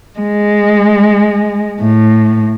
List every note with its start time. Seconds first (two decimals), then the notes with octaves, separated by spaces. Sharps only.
0.19 G#3
1.81 A2